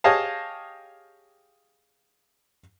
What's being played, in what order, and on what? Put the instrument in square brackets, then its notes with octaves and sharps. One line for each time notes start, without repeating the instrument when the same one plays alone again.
[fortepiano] G4 G#4 C#5 D#5 F5 A5